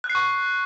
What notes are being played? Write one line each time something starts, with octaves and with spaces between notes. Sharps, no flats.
F#6
C7
C#6